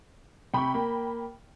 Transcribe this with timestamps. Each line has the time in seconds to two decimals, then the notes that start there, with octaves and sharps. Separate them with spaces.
0.54 C3 G5 B5 C#6
0.74 A#3